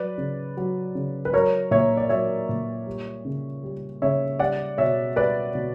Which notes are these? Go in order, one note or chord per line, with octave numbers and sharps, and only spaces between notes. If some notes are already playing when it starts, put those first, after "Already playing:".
Already playing: F#3 B4 D5
C#3
F#3
C#3
B4
F#3 A#4 C#5
A#2 C#5 E5
D5
F#3 C#5 E5
A#2
G3
C#3
G3
C#3 C#5 E5
G3 D5 F#5
B2 C#5 E5
G3 B4 D5
B2